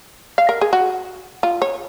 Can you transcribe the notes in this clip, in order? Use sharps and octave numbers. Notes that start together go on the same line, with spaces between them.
F5
A#4
G#4
F#4
F4
C#5